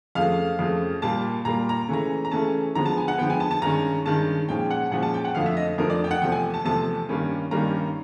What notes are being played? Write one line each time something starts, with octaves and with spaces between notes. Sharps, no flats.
F2 C#3 F3 A3 F5
F2 C#3 F3 A3
A#2 G3 A#3 A5
A#2 G3 A#3 A#5
A#5
C#3 E3 A3 C#4 A#5
A#5
C#3 E3 A3 C#4 A5
D3 F3 G#3 B3 A#5
A5
G#5
F#5
D3 F3 G#3 B3 G5
G#5
A5
A5
G2 D#3 G#3 C#4 A#5
G2 D#3 G#3 C#4 A5
A#2 F3 G#3 C#4 G5
F#5
A#2 F3 G#3 C#4 F#5
A5
G5
F#5
F2 D3 F3 A3 F5
E5
D#5
F2 D3 F3 A3 A#4
D5
G5
F#5
E2 C3 F3 A3 G5
G#5
A5
E2 C3 F3 A3 A5
G2 D#3 G3 A#3 C#4
G2 D#3 G3 A#3 C#4 A#5